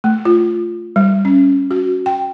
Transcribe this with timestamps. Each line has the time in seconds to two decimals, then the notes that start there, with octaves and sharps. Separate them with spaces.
0.04 A3
0.25 F4
0.96 G3
1.25 C#4
1.71 F#4
2.06 G5